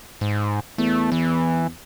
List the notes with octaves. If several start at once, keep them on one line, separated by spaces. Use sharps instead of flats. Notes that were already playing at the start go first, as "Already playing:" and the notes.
G#2
E2 A3
E3